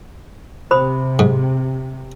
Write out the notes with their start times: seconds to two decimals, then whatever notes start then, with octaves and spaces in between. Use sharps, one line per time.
0.71 C3 C5 B5 D#6
1.19 G#2